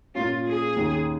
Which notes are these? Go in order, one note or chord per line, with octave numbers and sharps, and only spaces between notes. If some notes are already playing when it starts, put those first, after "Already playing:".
A#2 A#3 C#4 F4
G#4
D#2 D#3 C#4